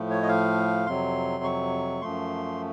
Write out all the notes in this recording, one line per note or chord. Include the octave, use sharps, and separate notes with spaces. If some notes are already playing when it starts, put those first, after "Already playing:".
Already playing: A2 F3 A3
C#5
D#5
F5
F2 C3 F#3 C6
C#6
F#2 F3 A3 C6